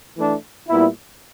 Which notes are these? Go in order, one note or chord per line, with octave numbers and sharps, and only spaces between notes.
E3 A3 D4
A#2 G3 B3 E4